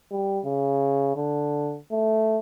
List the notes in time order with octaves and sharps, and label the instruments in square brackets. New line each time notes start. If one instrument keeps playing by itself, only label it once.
[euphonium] G3
C#3
D3
A3